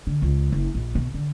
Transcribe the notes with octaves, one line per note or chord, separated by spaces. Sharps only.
D3
C#2
F#1
A#1
B2
D3